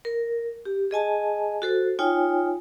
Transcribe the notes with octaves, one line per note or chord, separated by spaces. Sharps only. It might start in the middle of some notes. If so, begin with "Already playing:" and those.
A#4
G4
G#4 D#5 G#5 A5
F#4 A4 C5
D#4 F4 C#5 G5 G#5